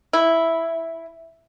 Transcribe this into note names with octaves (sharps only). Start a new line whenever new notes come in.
E4